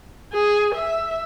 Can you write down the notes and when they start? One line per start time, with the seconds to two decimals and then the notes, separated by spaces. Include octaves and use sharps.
0.33 G#4
0.75 E5